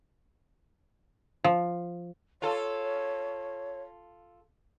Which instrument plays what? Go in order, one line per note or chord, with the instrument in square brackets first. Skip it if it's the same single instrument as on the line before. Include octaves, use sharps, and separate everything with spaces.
[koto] F3
[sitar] F4 A4 [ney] C#5